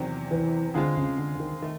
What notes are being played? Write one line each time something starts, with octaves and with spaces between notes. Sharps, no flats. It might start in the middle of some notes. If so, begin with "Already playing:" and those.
Already playing: E2 C3 D#3 F#3
E3
D3 G#3 C4 F4 G#4
C#3
D3
D3
D#3
D#3 A3